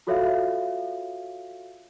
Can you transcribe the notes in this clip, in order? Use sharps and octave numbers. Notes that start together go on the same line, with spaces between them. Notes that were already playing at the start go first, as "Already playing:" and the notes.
F4 F#4 A4 C#5 E5 F5